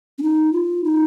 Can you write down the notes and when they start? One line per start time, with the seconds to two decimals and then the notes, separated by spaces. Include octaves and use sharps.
0.18 C#4
0.22 D#4
0.53 F4
0.84 D#4